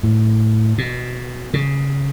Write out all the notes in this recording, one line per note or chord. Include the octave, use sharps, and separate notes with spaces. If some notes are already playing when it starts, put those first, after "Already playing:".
A2
B2
C#3